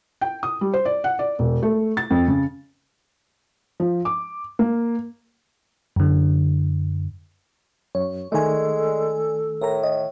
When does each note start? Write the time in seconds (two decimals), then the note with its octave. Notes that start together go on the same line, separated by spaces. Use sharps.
0.21 G5
0.43 D#6
0.61 G3
0.74 C5
0.85 D5
1.04 F#5
1.19 D5
1.39 E1
1.63 A3
1.97 A6
2.10 F2
2.28 C#3
3.80 F3
4.05 D6
4.59 A#3
5.96 F#2 D3
7.95 F#2 C#5
8.32 D#3 G#3 A3 A4 D5 G#5
9.62 A2 A#4 A#5
9.83 D#5